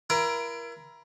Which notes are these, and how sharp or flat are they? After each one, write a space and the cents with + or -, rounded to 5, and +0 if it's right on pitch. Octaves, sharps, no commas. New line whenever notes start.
E4 +35 A#4 +25